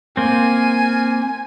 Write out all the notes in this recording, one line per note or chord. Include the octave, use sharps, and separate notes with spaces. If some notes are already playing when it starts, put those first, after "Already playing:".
A#3 C4 G#5